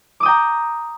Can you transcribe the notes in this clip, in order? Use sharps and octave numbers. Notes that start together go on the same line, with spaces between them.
G5 A#5 D6 D#6